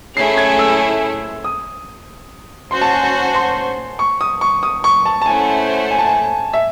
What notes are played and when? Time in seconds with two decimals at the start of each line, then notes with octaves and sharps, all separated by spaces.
0.16 A3 C#4 E4 G#4 C7
0.37 G#6
0.59 E6
1.44 D#6
2.71 C#4 F#4 C5 C6
2.81 A5
2.93 G#5
3.04 A5
3.35 C6
3.99 C#6
4.21 D#6
4.41 C#6
4.63 D#6
4.84 C#6
5.05 A5
5.22 A5
5.26 A3 C#4 E4 C5 F#5 G#5
5.91 G#5
5.99 A5
6.06 G#5
6.54 E5